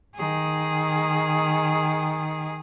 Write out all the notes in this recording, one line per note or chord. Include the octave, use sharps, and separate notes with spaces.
D#3 G#4